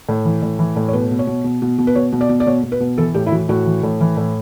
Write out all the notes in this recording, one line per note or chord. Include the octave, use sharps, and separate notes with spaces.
A2
E3
A2
E3
A2
C#5
B2 B4
B2
C#5
B2
B2
B2
B2
B4
B2 C#5
B2
D5
B2
D5
B2 C#5
B2
B4
B2
E3 A4
A2 G4
E4
E3 F#4
A2 F#4
E3
A2
E3
A2